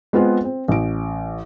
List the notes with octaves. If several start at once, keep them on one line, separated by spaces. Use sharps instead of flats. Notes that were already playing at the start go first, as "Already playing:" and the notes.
G#3 B3 C4 F4 G#4 F#5
C4
A1 D7